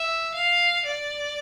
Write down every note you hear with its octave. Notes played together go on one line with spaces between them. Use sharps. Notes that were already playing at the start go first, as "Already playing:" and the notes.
Already playing: E5
F5
D5